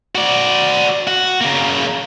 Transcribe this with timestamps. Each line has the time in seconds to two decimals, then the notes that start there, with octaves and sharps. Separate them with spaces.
0.15 F#4 D5
1.07 F#4
1.41 C#3 A#3